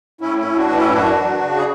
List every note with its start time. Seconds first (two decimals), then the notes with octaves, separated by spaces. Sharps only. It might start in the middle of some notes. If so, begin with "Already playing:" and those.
0.21 A2 C#4 E4
0.38 C#4 E4
0.45 A2
0.56 D4 F#4
0.69 E3
0.75 C#4 E4
0.92 F#2 D4 F#4
1.16 F#3
1.40 C#3
1.58 G#4